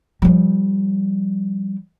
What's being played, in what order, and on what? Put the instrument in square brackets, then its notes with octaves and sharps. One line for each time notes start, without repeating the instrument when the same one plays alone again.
[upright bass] F3 G3